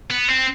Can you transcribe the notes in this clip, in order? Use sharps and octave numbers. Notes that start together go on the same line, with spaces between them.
B3
C4